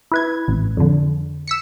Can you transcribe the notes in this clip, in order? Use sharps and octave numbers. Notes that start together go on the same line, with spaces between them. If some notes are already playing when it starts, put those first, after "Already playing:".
E4 B4 G#6
A1
F2 D3
E6 B6 C#7